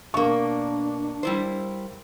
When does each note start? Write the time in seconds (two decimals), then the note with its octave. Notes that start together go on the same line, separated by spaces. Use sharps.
0.14 B2 A#3 D4 A#4 F5 C#6
1.23 G3 E4 C5